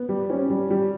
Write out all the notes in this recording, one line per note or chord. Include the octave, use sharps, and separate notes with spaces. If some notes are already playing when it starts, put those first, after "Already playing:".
Already playing: B3
G3
C#4
G3
G3